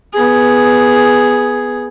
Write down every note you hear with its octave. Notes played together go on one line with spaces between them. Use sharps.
B3 G#4